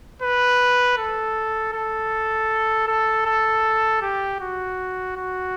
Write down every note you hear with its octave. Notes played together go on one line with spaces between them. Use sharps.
B4
A4
A4
A4
A4
G4
F#4
F#4